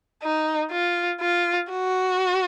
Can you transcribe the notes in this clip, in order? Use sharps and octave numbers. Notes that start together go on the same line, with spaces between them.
D#4
F4
F4
F#4